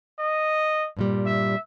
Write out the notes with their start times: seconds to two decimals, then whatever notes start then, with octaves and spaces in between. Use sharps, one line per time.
0.19 D#5
0.97 G2 A#2 G3
1.26 E5